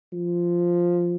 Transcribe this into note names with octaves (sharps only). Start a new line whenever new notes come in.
F3